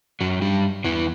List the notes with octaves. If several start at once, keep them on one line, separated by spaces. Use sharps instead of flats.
F#2 F#3
G2 G3
E2 E3